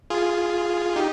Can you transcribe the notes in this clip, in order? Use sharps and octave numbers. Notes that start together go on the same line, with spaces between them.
F4 G#4
D#4 G4